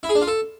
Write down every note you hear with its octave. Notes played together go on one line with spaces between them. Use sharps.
E4
G#4
D4
F4
A4